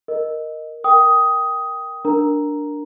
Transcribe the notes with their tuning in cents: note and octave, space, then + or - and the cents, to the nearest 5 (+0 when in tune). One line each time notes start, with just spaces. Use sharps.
A#4 +0 D#5 +0
A#4 +0 G5 +0 D#6 +10
D4 +0 A#4 +0 A#5 +0